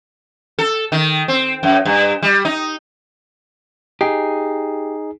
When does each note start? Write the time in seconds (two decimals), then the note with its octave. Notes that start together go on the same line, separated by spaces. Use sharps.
0.59 A4
0.92 D#3
1.28 C4
1.63 F#2
1.85 G2
2.22 G3
2.45 D#4
4.01 D#4 G4 G#4 C7